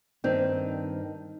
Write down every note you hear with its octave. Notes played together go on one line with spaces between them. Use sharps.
G2 D#3 C4 D#4